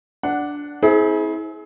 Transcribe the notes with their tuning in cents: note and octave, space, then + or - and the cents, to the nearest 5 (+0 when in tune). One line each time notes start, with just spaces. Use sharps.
D4 -5 F#5 +0
C4 +0 E4 -35 G#4 +25